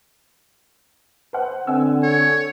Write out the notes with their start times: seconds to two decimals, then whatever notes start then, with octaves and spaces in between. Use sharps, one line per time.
1.33 B4 C5 F#5
1.67 D3 C4 F#5 G#5 E6
2.03 A4 C#5